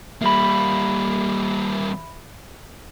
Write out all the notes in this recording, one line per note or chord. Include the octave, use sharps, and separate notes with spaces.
G3 A#3 E5 B5